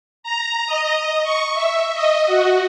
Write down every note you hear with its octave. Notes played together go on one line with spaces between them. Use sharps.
A#5
D#5
C#6
E5
D#5
F#4